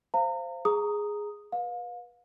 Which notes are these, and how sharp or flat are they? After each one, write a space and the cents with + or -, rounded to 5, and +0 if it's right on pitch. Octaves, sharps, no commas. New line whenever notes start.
C5 +0 F5 -25 A#5 -35
G#4 +0 A#5 +0 D#6 +0
B4 -20 F5 +35